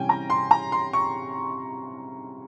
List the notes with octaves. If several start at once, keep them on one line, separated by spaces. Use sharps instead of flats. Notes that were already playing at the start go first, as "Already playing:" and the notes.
Already playing: C3 E3 G3 C#4 G5 G#5
A#5
C6
A#5
C6
C#6